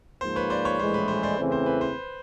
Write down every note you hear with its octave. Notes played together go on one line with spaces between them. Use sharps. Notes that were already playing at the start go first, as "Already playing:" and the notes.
G#2 F3 A#3 C5
B4 C#5
C5 D5
B4 C#5
A#1 A2 E3 G#3 C5
B4
C5
C5 D5
E2 C#3 E3 A3 C4
C5
B4
C5